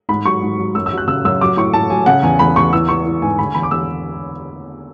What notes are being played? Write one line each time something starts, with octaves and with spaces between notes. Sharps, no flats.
G#2 B5
F#3 C#6
G#2
F#3
F#2 E6
E6
F#3
F#6
C#3 E6
F#2 E6
F#3 D6
A2 C#6
A2 A5
F#3 G#5
C#3 F#5
E2 G#5
E2 B5
E2 C#6
E3 E6
E3 C#6
E3
G#2 G#5
D3 B5
G#5
E2 B5
D6
E2 E6